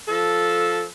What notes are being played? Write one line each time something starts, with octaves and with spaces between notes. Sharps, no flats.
F3 A4